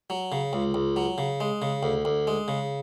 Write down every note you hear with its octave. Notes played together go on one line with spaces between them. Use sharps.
F#3
C#3
C#2
C#2
F#3
C#3
G#3
C#3
D2
D2
G#3
C#3